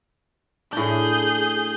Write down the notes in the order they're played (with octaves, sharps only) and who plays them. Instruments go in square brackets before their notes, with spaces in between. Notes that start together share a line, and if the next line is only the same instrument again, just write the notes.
[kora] A2 D4 [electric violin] G#4 G6